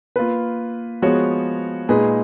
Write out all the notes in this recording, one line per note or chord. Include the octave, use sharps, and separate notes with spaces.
A#3 F4 B4
F3 G#3 B3 F#4 C#5
A#2 G#3 D#4 G#4 B4